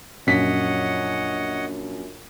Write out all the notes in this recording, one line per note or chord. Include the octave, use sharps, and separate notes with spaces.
A#1 F#2 C#5 D#5 F#5 B6